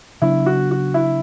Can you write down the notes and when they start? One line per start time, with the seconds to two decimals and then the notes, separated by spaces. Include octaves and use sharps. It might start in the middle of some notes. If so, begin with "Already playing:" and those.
0.22 C#3 F#3 B3 D4 E4
0.46 F#4
0.71 F#4
0.94 E4